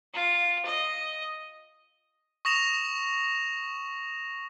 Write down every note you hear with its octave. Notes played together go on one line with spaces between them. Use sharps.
F4
D#5
C#6 D#6 A#6 E7 F7